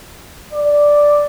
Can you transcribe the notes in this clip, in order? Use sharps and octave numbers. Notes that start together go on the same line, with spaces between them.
D5